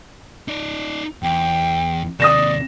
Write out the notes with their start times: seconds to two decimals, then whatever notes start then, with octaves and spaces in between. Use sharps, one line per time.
0.48 D#4 D5
1.23 E2 G5
2.20 D#2 C3 D5 D#6 A#6 E7